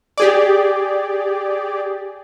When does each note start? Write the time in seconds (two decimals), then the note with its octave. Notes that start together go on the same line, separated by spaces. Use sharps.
0.18 G4 G#4 D5